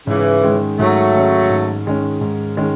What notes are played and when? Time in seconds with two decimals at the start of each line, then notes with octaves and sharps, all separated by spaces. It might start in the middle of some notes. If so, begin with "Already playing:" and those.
0.07 G#2 C#3 E3
0.43 D#3 G#3 C#4
0.78 G#2 F#3 A3
1.14 D#3 G#3 C#4
1.50 G#2
1.86 D#3 G#3 C#4
2.21 G#2
2.57 D#3 G#3 C#4